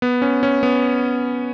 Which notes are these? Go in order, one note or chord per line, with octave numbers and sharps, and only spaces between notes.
B3
C#4
C#4
B3